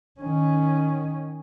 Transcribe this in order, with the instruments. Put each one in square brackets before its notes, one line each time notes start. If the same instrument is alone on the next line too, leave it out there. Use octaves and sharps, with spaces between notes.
[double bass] D#3 C#4